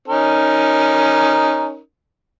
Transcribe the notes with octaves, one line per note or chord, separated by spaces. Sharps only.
C#4 D#4 A#4